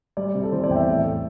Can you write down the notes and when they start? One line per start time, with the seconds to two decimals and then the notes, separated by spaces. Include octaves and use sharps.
0.17 G3 D5
0.35 C3
0.43 A4
0.52 E3 C5
0.64 D5
0.69 E2 G5
0.76 E5
0.87 A2 E5
1.05 A3